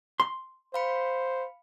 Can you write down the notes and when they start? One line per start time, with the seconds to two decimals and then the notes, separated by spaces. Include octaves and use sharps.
0.20 C6
0.74 C5 F5 B5 C#7